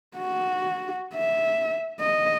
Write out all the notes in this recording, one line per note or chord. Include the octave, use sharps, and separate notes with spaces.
F#4
E5
D#5